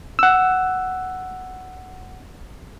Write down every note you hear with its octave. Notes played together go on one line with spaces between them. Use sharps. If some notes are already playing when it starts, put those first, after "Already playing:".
F#5 E6